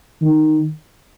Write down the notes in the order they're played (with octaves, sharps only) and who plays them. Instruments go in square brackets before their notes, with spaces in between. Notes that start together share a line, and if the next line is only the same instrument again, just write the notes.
[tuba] D#3